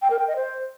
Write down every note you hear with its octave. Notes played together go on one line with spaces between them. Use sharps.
G5
A#4
G5
D#5
C5